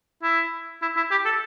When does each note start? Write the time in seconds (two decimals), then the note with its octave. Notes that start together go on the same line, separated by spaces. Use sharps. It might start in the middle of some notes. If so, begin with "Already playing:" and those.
0.23 E4
0.82 E4
0.97 E4
1.11 G4
1.25 A4